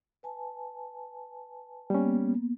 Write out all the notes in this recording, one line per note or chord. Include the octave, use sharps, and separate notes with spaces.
B4 G#5 A5
G3 A#3 B3 C#4